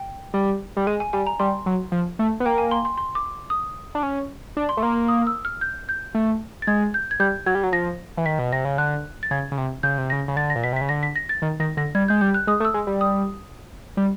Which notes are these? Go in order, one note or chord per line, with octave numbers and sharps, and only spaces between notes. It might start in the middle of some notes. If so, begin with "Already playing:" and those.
Already playing: G5
G3
G3
G#3 G#5
G#5
G3 G#5
A#5
G3 C6
F#3
F3
A3
B3
A#3 G5
G#5
C6
C6
C6
D6
D#6
D4
C#4
D4
C6
A3
A#3 C6
D#6
E6
F6
G6
G6
A3
A6
G#3 G#6
G6
G#6
G3 G6
F#3 G#6
G3
F#3
F3 A#6
E3
D#3 B6
B2
C3 A#6
C#3
D3 F#6
A6
C#3 G#6
C#3
C3
C#3 G6
C3
C#3 A#6
C#3
D3 A6
A#6
A#2
B2 B6
C3
B6
C#3
D3 A#6
B6
A#6
A6
D#3
D#3 A#6
D3 A#6
G3 G#6
G#3 G6
G3 G6
F#6
G#3 D#6
A3
E6
G#3
G3
D#6
G3